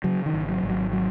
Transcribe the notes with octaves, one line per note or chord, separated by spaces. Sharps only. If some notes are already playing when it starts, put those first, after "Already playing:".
C#3 F#3
D#3
G#1
F#3
G#1
F#3
F#3